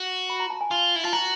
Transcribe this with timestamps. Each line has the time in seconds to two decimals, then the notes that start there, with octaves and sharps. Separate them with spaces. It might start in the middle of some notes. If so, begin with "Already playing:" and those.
Already playing: F#4
0.30 B5
0.40 A#5
0.50 A5
0.61 G#5
0.71 F4
0.96 E4
1.04 F4 A5
1.13 F#4 A#5